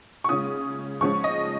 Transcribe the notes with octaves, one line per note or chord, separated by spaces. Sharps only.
C#6
C#3 G#3 C#4 F4 D#6
C#3 F3 G#3 C#4 C#6
D#5